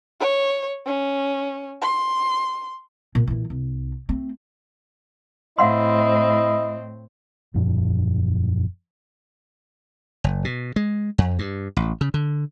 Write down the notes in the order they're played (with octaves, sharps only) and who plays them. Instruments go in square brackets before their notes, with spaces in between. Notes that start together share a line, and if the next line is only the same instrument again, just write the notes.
[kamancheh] C#5
C#4
C6
[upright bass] A#2
A#2 E3
C2
A3 C4
[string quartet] A2 C4 [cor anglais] E4 [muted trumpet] D#5 [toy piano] F5 F#5 C6
[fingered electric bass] E1 F#2 A#2 F3
[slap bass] F#1
B2
G#3
F2
G2
A1
C#3
D3